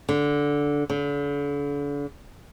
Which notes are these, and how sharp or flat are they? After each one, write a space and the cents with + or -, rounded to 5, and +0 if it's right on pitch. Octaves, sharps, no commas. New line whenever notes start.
D3 -10
D3 -40